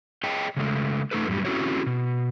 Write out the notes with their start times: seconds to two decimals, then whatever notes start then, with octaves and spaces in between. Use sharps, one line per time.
0.24 G#4 C#5 D#5 G5 A5
0.57 C#3 G#3 A3
1.11 A3 D#4 A4 B4
1.28 F#2 A2 D3 G3
1.45 C4 C#4 E4 F#4 A4 C#5
1.86 B2